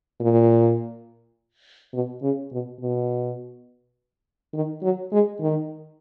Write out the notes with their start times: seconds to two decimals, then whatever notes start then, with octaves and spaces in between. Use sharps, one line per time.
0.20 A#2
1.94 B2
2.22 C#3
2.52 B2
2.81 B2
4.54 D#3
4.83 F#3
5.12 G#3
5.41 D#3